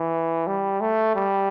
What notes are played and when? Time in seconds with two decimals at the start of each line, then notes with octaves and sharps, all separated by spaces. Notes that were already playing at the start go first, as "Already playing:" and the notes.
Already playing: E3
0.47 G3
0.80 A3
1.15 G3